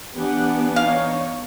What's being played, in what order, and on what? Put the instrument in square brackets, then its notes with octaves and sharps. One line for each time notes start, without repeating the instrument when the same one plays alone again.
[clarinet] E3 [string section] B3 D4 [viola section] G4 F#5
[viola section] D#4 C#5 [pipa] F5